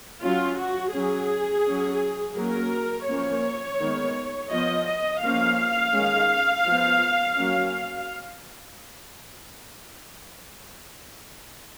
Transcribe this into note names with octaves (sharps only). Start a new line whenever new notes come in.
F#3 C#4 F4
F#4
F#3 C#4 G#4
F#3 C#4
F#3 A#3 C#4 A#4
F3 A#3 C#4 C#5
D#3 G#3 B3
F3 B3 D#5
D#5
F3 A#3 C#4 F5
D#3 G#3 C#4
F3 B3
F#3 A#3 C#4